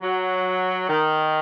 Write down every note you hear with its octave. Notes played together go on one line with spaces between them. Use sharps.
F#3
D#3